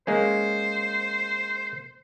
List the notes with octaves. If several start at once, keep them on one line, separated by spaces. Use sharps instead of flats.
G#3 A#3 C#4 C5